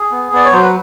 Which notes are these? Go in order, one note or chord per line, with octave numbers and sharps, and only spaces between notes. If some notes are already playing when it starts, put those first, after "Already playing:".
Already playing: G#4
B3
B3 D5
C#5
F#3 C5
B4